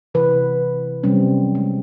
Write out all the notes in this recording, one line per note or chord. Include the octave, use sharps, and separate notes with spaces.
C3 E3 B4
C3 F#3 G3 C4 C#4
G#3